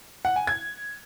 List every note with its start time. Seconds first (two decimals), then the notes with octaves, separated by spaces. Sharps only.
0.25 F#5
0.36 G#5
0.47 G#6